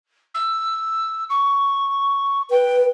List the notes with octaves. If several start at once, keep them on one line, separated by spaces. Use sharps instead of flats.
E6
C#6
B4 G5